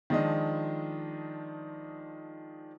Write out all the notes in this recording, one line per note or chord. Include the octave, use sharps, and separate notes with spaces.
D#3 F3 G#3 D4 F4 D#5